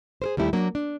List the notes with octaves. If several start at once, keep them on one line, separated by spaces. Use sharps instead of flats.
G#4 A#4 C5
D#2 G3 A3 E4 G4
F#3 A#3 D4
D4